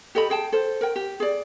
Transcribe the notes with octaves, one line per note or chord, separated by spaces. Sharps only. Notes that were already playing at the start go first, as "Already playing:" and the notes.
G4 A4 D#5 B5
G#4 G5 A5
A4 C5
A#4 G5
G4
G#4 D5